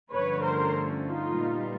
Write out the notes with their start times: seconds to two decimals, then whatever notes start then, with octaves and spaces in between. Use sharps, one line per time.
0.12 G2 D3 F3 A3 C#4 B4 C#5
0.43 A#4 C5
1.07 D#4 F4
1.37 A#2 G3 B3